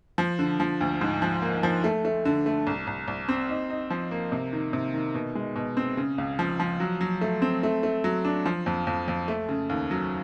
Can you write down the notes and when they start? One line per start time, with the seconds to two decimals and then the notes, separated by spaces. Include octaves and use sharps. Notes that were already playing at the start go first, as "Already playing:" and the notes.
0.18 F3
0.39 D3
0.60 F3
0.81 D2
1.01 G#2
1.22 F3
1.42 A#3
1.63 F3
1.84 A3
2.05 A3
2.25 D3
2.46 A3
2.67 C2
2.87 C2
3.08 C2
3.29 C4
3.49 D#4
3.70 D#4
3.90 F3
4.11 A#3
4.32 C3
4.53 D#3
4.73 C3
4.94 D#3
5.15 B2
5.35 G#3
5.56 B2
5.77 C4
5.97 C#3
6.18 C#2
6.39 F3
6.60 F3
6.80 F#3
7.01 F#3
7.21 A3
7.42 C4
7.63 A3
7.83 A3
8.04 F#3
8.24 D4
8.46 F3
8.66 F2
8.87 F2
9.08 F2
9.28 A3
9.49 C#3
9.69 D#2
9.91 F#3